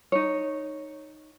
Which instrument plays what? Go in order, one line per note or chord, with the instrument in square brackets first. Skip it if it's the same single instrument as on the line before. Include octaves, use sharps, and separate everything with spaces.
[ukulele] D#4 C#5